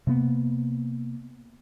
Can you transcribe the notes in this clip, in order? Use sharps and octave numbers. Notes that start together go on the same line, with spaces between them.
C3 A#3 B3